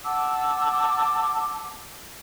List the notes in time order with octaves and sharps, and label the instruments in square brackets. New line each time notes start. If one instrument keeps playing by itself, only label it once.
[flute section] F#5 A5 D6 E6